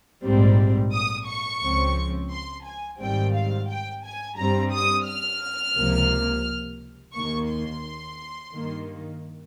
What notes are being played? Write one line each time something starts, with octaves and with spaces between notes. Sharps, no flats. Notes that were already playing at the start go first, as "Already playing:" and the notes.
A#1 G#2 G3 C4
D#6
C#6
C#2 C#3 F3 C4
C6
G#5
G#1 G#2 D#3 G3 C4 G5
F5
G5
G#5
G2 G3 C4 A#5
D#6
F6
C#2 C3 F3 A#3
D#2 D#3 A#3 C#6
C6
G2 D#3 A#3